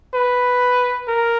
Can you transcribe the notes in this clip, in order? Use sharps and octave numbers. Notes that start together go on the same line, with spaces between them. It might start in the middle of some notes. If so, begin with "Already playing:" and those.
B4
A#4